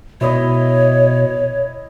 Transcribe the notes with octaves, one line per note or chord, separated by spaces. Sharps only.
B2 E4 C#5 D#5